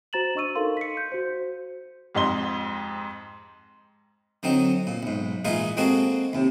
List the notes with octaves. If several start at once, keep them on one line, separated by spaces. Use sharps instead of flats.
F#4 C5 A#5 A6 E7 F#7
D4 D#5 C#6 E6 D#7
D#4 A4 A#4 F5 C6
B6 C#7
G6
F#4 C5
F2 G#2 G4 D#5 C6 G7
D3 F#3 C4 D#4
A#2
B1 G#2
A#2 E3 G#3 D#4 F4 G#4
G#3 A#3 C4 F#4 G#4 A4
D#2 C3